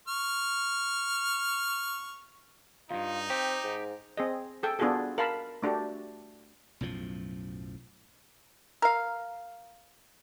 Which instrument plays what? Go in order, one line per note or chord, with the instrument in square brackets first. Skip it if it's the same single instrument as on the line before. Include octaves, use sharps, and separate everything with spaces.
[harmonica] C#6 F6
[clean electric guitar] E2 G2 [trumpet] D#4 [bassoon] F4
[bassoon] C4 [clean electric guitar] G4
[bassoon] G#2
[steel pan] C4 G#4 D#5
G#4 A4 G5
B3 D4 F4 F#4 G#4 A4
A#4 F5 A5 B5
A3 D4 F#4 G4
[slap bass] B1 F#2 A2 F3
[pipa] A#4 F5